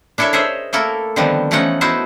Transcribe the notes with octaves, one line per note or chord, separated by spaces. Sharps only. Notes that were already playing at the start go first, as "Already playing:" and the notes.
D4 E4 A4 A#4 C#5 E5
G#4 A#4 C5 C#5 D#5 E5
A3 A#3 E4 A4 A#4
D3 D#3 F3 G3 B3 C4
E3 F3 A3 C#4 D#4 F#5
B3 D#4 E4 F#4 C5 A5